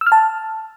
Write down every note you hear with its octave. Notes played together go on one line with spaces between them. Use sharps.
E6
F6
A5